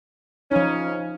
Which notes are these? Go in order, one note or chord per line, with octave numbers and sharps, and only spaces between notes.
C#3 F3 C#4 D#4